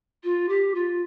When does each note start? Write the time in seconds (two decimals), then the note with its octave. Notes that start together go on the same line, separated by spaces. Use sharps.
0.23 F4
0.48 G4
0.74 F4